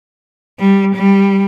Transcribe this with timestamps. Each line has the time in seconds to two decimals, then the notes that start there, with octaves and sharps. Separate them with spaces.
0.59 G3
0.95 G3